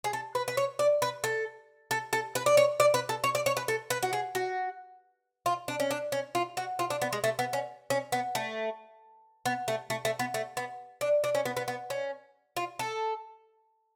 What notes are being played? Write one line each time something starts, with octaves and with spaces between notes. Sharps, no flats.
G#4
A4
B4
B4
C#5
D5
B4
A4
A4
A4
B4
D5
C#5
D5
B4
A4
C#5
D5
C#5
B4
A4
B4
F#4
G#4
F#4
F4
D4
C#4
D4
C#4
F4
F#4
F4
D4
B3
G#3
A3
B3
C#4
C#4
B3
A3
B3
A3
A3
A3
B3
A3
B3
D4
D4
C#4
B3
B3
B3
C#4
F4
A4